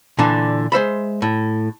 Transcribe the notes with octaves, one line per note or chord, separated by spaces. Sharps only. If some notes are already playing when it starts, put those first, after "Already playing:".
A#2 D3 E3 D4
G#3 C5 E5 B5
A2